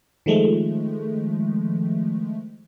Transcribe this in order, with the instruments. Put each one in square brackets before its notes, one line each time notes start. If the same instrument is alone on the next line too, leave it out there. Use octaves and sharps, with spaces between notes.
[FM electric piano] D#3 F3 G#3 A3